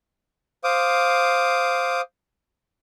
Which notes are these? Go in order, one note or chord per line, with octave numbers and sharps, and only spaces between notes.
C5 F5 D6 D#6